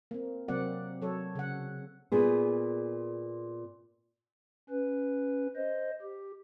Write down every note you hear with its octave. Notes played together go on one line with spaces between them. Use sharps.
A#3 C4
C3 F#3 A#3 C4 D5 F#5
F#3 A4 C#5
C#3 F#5
A#2 B3 G#4
C#4 B4
C5 D#5
G4